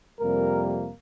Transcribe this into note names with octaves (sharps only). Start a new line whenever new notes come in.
F2 C3 G3 A#3 A#4